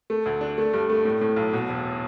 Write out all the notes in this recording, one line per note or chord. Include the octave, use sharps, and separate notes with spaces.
A3
D2
D4
A3
G2
A3
A2
A2
B1
B2
E1